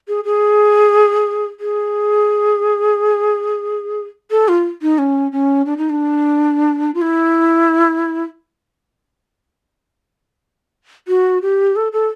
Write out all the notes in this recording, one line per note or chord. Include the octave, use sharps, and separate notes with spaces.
G#4
G#4
G#4
A4
F4
D#4
C#4
C#4
D4
D#4
D4
F4
E4
F#4
G4
A4
A4